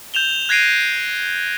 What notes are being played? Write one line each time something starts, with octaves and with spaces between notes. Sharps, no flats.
G6 E7 F7 G7
F#6 G#6 A#6 C7 D7 D#7